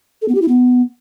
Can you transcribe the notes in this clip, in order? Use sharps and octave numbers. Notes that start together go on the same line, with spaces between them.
A4
B3
G4
E4
B3